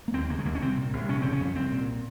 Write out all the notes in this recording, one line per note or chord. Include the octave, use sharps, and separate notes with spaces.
A#3
D#2 C4
C#3 A#3
G#3
D#2 A#3
C#4
C2 C4
A#2
C2
F2 C#4
C#3 C4
C#4
F2
C2 C4
A#2